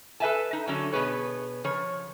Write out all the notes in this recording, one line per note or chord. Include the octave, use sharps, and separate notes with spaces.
A4 B4 D#5 E5 G#5 A5
D#4
D3 F#3 C#4 F#4 A4 C#5
B2 B3 G#4 B4 C#5
C#3 F3 C#5